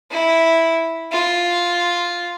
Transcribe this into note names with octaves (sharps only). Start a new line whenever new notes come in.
E4
F4